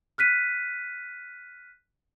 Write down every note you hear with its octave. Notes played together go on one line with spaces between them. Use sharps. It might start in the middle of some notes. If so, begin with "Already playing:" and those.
F6 F#6 B6 D#7